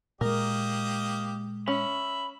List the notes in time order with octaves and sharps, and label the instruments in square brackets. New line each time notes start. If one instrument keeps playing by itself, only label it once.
[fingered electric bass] A#2 G#3 [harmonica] A#3 G4 D#5 [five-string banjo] A#4
[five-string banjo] C#4 [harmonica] E5 [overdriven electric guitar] B5